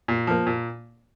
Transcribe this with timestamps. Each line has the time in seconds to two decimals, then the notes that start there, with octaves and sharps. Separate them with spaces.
0.08 A#2
0.27 F3 A#3
0.47 A#2